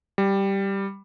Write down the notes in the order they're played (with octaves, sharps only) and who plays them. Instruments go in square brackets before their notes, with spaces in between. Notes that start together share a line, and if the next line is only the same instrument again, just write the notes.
[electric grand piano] G3